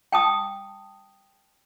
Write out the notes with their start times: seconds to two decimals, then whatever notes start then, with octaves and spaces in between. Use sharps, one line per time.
0.12 G5 A5 D#6